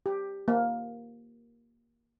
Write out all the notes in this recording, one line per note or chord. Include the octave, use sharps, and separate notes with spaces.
G4
A#3